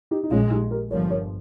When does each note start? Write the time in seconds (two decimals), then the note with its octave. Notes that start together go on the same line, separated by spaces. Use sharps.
0.11 D#4 G4
0.24 D#4
0.31 A#1 A#2 G#3 C#4 F4
0.51 D#4 G4
0.71 G4 A#4
0.90 G1 G2 F3 A#4 C#5
1.10 A#4 C#5